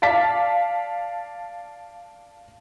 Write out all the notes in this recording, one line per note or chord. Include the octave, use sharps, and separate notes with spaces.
D5 F5 A5 B6